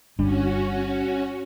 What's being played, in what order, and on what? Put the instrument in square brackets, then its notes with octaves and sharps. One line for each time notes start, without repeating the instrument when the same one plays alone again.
[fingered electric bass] G1 D4 [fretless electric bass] G3 [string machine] C#4 F#4